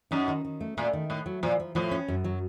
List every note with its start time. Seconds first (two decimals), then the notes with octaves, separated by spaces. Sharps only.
0.11 F#2 D#4
0.28 D#3
0.45 D#3
0.61 A3
0.77 A#2 A3
0.93 D#3
1.10 A2 A3
1.26 F#3
1.43 A#2 F3
1.60 F3
1.75 A2 F3
1.91 C#4
2.08 F#2
2.24 F#3